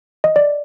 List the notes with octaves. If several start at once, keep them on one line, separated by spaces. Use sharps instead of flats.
D#5
D5